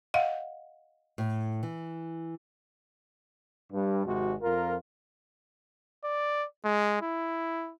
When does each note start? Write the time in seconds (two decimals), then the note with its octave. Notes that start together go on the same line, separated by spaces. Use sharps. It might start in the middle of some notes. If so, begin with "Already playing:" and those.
0.14 D#5 F5 F#5
1.18 A2
1.63 E3
3.73 G2
4.06 G#1 C3 G#3 F#4
4.42 F2 F4 A#4
6.04 D5
6.65 G#3
7.02 E4